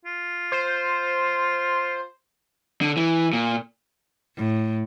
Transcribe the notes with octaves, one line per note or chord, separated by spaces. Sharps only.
F4
C5
D3
E3
A#2
A2